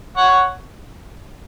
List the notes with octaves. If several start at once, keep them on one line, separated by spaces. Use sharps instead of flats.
C#5 F#5